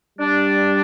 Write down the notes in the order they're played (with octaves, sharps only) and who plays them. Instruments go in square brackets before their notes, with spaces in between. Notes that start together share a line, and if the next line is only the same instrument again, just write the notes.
[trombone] G3 [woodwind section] D4